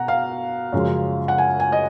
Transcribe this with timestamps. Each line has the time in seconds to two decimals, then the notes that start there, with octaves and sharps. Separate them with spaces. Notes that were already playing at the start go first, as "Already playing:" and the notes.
Already playing: B2 F#5 A#5
0.08 F5
0.73 F#2 C#3 F3 G#3
1.28 F#5
1.38 G#5
1.60 G#5
1.72 D#5